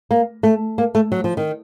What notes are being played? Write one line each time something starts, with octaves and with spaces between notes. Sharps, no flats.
A#3
A3
A#3
A3
F#3
F3
D#3